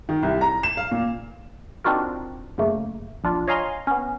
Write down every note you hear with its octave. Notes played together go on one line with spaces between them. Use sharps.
D#3
C2
A#5
E7
F5
A#2
C4 D4 D#4 F4 F#4 A#4
F#2 C#3 A3 A#3
A#1 D4 F4
C#5 D#5 F5 G#5 A#5 C6
B3 C#4